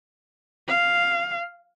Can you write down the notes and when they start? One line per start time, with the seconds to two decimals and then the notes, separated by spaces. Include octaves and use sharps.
0.68 F5